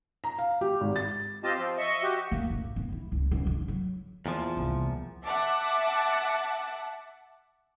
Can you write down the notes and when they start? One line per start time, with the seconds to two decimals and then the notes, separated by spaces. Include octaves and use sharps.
0.24 A#5
0.38 F5
0.61 G4
0.81 G#1
0.96 A6
1.44 C4 F4 G4 D#5 A5
1.58 F3 C4
1.78 D#5 E5 C#6
2.03 F#4 G4
2.32 A#3
2.50 A1
2.76 B3
2.92 E4
3.12 C#2
3.31 C#2
3.47 D3
3.68 F#3
4.26 E2 A#2 F3
4.57 C2
5.24 E5 F#5 A5 D6